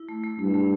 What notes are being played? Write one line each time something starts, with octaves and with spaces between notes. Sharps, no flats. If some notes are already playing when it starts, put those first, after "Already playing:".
Already playing: E4
A3
A3
G2 A3
A3